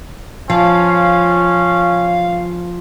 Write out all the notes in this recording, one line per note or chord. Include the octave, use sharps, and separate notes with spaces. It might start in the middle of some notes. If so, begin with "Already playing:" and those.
F3 C#4 F5